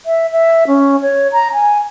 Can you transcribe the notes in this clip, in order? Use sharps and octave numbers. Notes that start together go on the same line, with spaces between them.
E5
E5
C#4
C#5
A#5
G#5